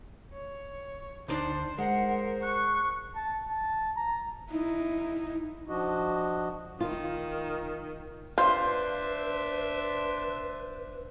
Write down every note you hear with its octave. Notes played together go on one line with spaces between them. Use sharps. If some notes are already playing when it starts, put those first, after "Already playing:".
C#5
D2 D4 D#4 C5 D5
G#3 A#4 C5 F#5
C#6 F#6
A5
A5
A#5
D#4 E4
F3 D4 F#4 D#5
D#3 F4
D4 F4 B4 C5 E5